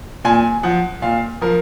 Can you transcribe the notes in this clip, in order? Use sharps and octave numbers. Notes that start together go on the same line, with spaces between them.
A#2 G#5
F3 F#5
A#2 F5
F3 A#4